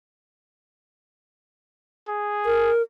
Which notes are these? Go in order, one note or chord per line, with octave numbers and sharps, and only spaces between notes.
G#4
A#4